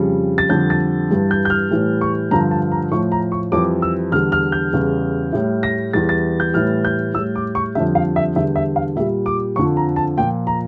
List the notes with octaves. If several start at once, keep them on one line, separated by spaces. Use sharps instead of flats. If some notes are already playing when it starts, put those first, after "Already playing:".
Already playing: F2 C#3 G3
A6
F2 D3 G3 G6
A6
G2 E3 G3
G6
G6
F6
A2 E3 G3
C#6
G2 D3 F3 A#5
A5
A#5
A2 F3 C#6
A#5
C#6
F2 E3 G3 D6
E6
E2 D3 G3 F6
F6
G6
E2 C#3 G3
A2 G3
A#6
E2 E3 G3 A6
A6
G6
A2 E3 G3 F6
G6
A2 G3 E6
D6
C#6
F2 D3 G3 E5
F5
E5
E2 D3 G3 E5
E5
F5
A#2 G3 E5
D6
F2 D3 F3 C#6
A#5
A5
A#2 F3 G5
A#5